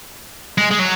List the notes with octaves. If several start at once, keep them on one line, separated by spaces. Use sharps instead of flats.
G#3
G#3
F#3